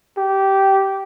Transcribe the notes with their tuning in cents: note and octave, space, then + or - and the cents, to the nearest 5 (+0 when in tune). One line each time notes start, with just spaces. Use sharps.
G4 -15